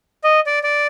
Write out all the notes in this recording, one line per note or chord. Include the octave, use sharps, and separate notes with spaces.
D#5
D5
D5